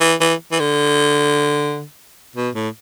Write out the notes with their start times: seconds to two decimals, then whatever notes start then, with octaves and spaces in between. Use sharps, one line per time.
0.01 E3
0.20 E3
0.52 E3
0.60 D3
2.36 B2
2.55 A2